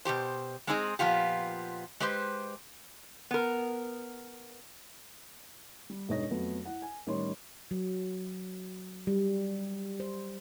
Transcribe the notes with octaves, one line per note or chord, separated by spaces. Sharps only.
B2 D#3 G4 C5
G#3 C4 D4 D#4 G#4 D#5
A#2 F3 B3 F4 G4
G#3 G4 B4 C5
B3 A#4
G3
E1 G2 D#4 C#5 D#5 A#6
F2 F#3 A3 B3
E4 F#5
G#5
A1 D#3 G3 C#5 C6
F#3
G3
C5